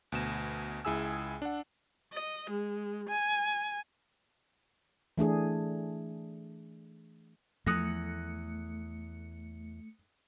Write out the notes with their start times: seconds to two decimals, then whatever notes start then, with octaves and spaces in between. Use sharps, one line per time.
0.12 D2 B2 E7
0.85 C#2 E4 G#4 G#5 E6
1.42 D4 F#5
2.13 D#5
2.50 G#3
3.09 G#5
5.18 E3 A3 D4 G#4
7.67 E2 F3 A3 D#6 F#6 A#6 C#7